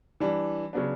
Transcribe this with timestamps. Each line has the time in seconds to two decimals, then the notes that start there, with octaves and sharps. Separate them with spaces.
0.20 E3 G3 D4
0.73 C#3 F#3 B3 D4